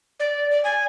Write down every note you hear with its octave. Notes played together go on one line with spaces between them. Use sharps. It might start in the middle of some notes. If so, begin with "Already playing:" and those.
D5
D5
G#5